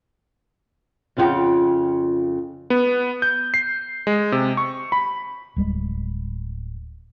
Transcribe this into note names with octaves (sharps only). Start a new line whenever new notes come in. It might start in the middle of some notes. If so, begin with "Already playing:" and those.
F2 C#3 F4 F#4 F#5 G5
B3
G6
C7
G#3
C3
C#6
B5
D1 G3 G#3